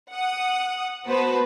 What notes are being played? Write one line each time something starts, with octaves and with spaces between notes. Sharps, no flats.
F#5 D#6
B3 F#4 B4 C5 A5